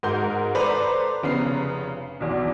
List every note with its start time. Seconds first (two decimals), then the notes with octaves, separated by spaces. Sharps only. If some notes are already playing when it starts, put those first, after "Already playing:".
0.03 G#2 F#4 A#4 C6 G6
0.55 A4 B4 C5 D5 A#5 B5
1.23 F1 C#3 B3 A#5 C7
2.20 B1 E2